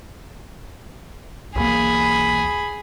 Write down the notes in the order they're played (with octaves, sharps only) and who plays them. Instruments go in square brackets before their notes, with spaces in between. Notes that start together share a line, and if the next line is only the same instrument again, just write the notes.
[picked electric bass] B1 E2 A#3 [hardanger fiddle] G#4 B5